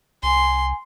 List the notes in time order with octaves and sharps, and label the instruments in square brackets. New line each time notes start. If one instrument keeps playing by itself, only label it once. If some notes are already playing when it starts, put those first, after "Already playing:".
[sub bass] C2 [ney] G#5 [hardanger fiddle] C6